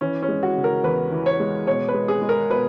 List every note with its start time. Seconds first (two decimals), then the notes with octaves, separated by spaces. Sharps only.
0.01 E3 C#4
0.22 C#4
0.28 G#3
0.43 F#4
0.57 C#3
0.64 A#4
0.84 E2 B4
1.12 E3
1.26 C#5
1.40 G#3
1.67 B2 C#5
1.88 B4
1.94 G#3
2.08 G#4
2.22 G#3
2.29 A#4
2.50 B2 B4